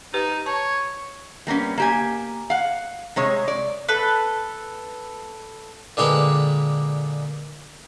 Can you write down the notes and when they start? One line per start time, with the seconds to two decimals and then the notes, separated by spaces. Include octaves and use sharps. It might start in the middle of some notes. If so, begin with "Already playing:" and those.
0.14 D#4 G4 B4
0.46 C#5 A5
1.47 G3 A#3 B3 C#4
1.78 A#3 G4 G#5
2.50 F5 F#5
3.16 C3 G#3 C#5
3.48 D5
3.89 A4 B4
5.97 A#2 D3 G#3 G4 B4